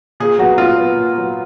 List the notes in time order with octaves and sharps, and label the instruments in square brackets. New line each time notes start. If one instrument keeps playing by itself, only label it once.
[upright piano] A#2 [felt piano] G#4
[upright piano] F#3 B3 [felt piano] F#4
[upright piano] A#2 [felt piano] F4
[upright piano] F#3 B3
A#2
F#3 B3